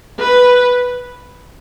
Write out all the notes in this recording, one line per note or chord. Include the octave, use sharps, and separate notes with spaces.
B4